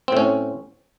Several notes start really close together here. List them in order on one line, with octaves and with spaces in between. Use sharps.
C4 A2 C#4